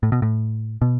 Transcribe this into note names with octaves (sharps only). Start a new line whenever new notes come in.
A2
B2
A2
B2